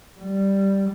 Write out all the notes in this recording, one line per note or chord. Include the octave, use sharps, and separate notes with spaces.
G3